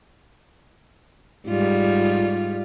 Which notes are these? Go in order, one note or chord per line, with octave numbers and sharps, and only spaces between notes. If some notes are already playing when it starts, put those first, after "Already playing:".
G#2 G3 F4